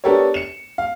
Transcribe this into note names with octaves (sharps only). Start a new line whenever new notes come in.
B3 D4 G4 A4 A#4 C#5
C#7 E7
F5